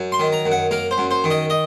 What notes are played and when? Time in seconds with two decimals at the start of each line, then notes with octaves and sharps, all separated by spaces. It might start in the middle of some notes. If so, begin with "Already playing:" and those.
Already playing: F#2
0.12 C6
0.20 D#3
0.32 A#5
0.46 F#2
0.52 F#5
0.71 A#3 A#4
0.91 C5
0.98 F#2
1.11 C5
1.24 D#3
1.30 D#5
1.50 D#5